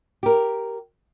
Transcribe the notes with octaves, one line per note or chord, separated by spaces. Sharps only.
G4 A#4